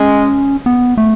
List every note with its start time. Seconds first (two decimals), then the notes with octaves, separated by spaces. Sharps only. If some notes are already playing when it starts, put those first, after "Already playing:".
Already playing: G#3 C#4
0.66 B3
0.97 A3